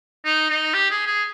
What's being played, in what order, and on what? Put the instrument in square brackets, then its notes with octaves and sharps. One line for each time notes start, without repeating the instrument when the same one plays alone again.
[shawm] D#4
D#4
G4
G#4
G#4